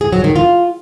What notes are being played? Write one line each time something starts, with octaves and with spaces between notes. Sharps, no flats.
G#4
F#3
D#3
F4